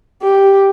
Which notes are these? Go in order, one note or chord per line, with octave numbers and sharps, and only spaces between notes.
G4